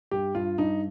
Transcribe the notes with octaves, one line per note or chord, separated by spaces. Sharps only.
G2 G4
G2 F4
G2 D#4